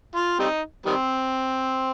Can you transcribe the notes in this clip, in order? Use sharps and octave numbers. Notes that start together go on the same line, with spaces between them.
F4
G3 C4 D#4
D#3 G3 C4